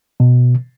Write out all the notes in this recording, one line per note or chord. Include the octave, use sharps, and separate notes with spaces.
B2